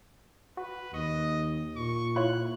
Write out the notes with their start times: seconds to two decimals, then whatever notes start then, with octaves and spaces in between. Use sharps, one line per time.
0.57 F#4 B4
0.94 D#2 D#5 C#6
1.76 A#2 C#6
2.16 E4 F4 C#5 F#6